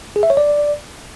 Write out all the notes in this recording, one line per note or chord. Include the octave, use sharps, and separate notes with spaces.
G#4
E5
C#5
D5